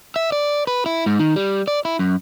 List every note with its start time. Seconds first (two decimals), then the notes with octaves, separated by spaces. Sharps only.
0.16 E5
0.32 D5
0.67 B4
0.86 E4
1.06 G#2
1.20 D#3
1.36 G3
1.68 D5
1.85 E4
1.99 F#2